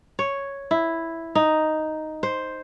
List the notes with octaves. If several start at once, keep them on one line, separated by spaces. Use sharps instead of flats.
C#5
E4
D#4
C5